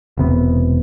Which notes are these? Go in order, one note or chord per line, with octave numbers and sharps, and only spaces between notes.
E1 C3 B3